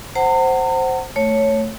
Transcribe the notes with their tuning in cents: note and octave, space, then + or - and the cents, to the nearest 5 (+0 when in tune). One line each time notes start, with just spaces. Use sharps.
C5 +0 F#5 +20 A#5 -45
A3 +0 C#5 +0